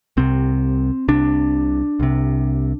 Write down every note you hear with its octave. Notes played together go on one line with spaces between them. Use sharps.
C2 C3 C4
C2 C3 D4
C2 C3